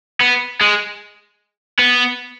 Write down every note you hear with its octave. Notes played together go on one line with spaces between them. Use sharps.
B3
G#3
B3